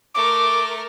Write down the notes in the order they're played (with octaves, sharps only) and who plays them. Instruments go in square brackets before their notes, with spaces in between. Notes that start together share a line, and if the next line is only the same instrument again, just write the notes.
[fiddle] A3 A#4 [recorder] D6